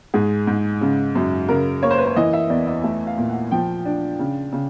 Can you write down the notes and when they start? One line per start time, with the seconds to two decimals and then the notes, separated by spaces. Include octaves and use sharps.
0.14 G#2 G#4
0.47 G#2
0.81 C#3
1.15 F#2
1.48 C#3 A#4
1.82 A#3 C#5
1.91 C5
1.98 B4
2.05 C5
2.16 E3 D#5
2.33 E5
2.50 E2 D5
2.67 D#5
2.83 A3 E5
3.07 F5
3.18 A#2
3.29 F#5
3.51 F3 G5
3.86 D4
4.19 C#3
4.53 C#3